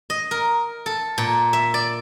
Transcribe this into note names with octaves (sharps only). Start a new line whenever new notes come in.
D#5
A#4
A4
A#2
E5
D5